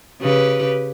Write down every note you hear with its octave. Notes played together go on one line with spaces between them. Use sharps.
C#3 G4 B4